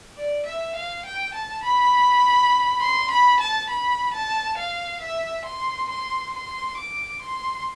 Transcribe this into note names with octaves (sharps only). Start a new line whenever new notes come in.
D5
E5
F5
G5
A5
B5
C6
B5
A5
B5
A5
F5
E5
C6
C6
C6
D6
C6